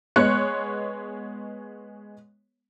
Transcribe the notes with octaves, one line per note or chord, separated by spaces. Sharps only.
G#3 B3 C#5 C#6 F#6 C#7